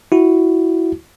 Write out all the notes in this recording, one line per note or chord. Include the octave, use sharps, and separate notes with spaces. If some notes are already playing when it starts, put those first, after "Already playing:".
E4 F#4